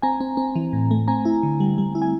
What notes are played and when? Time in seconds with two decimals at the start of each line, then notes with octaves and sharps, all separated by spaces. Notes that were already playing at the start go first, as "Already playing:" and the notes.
0.02 C4 G#5 A#5
0.21 C4
0.37 C4
0.56 E3
0.73 A2
0.91 A3
1.08 C4 G#5 A#5
1.25 E4
1.43 D3
1.60 G3
1.78 G3
1.95 E4
2.02 G#5